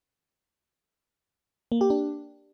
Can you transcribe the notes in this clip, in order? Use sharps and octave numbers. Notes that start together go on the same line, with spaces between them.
A#3
G4
D4